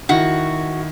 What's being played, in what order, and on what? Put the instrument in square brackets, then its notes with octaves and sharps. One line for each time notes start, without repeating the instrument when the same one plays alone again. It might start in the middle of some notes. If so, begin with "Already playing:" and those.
[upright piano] D#3 E4 [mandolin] F#4